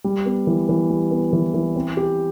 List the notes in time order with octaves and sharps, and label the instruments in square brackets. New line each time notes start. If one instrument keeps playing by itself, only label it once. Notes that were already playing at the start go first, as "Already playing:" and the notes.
[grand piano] G3
B3
E3
E3
G3
B3
E3
E3
C4
G4